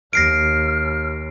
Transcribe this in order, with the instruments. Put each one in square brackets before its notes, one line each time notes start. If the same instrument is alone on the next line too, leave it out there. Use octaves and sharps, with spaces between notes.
[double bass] D#2 [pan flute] F6 [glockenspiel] A#6 C7 D7